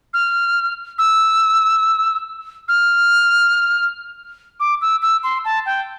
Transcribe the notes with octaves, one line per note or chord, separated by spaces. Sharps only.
F6
E6
F6
D6
E6
E6
C6
A5
G5